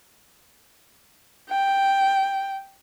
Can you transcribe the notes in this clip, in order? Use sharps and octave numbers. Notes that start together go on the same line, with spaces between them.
G5